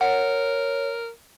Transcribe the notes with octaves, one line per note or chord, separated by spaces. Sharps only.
A#4 C#5 F#5